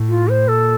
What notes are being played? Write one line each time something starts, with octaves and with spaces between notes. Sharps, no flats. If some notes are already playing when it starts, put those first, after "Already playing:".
Already playing: A2
F4
C5
A#2 A4